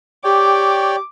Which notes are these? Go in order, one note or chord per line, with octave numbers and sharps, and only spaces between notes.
G4 C#5 D5 G5 D6